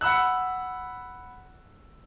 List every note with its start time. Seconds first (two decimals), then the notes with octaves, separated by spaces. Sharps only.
0.01 F#5 B5 E6 F#6